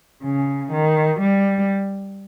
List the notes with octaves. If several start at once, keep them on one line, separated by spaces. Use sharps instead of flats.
C#3
D#3
G3